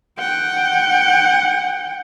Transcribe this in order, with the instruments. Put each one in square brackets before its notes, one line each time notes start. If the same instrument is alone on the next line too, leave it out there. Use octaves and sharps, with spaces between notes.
[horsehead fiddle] F#5 G5